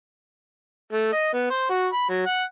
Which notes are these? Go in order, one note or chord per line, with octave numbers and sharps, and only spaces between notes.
A3
D#5
B3
C5
F#4
B5
F#3
F#5